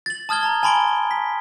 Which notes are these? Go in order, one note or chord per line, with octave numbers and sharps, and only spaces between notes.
A6 F#7
A5 D#6 F6 G#6 G7
A5 A#5
G#5 A5 B5 C6 D7 G7
B6